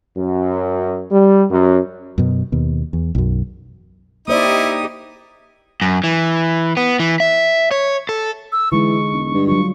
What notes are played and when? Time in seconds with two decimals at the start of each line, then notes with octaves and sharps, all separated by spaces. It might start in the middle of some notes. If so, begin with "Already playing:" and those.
0.17 F#2
1.11 G3
1.50 F#2
2.18 F#2 B2
2.52 D#2 B2
2.93 E2
3.15 B1 F#2
4.28 A#3 D#4 E4 G4 C5 D5 D#6
5.81 F#2
6.04 E3
6.77 B3
7.00 E3
7.20 E5
7.71 C#5
8.09 A4
8.52 E6
8.72 D3 E3 G#3 D#4 C#6
9.13 E1
9.34 G2
9.47 F#3 G3 F4 C#6